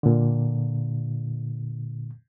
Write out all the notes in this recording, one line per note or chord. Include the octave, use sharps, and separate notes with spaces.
A#2 D3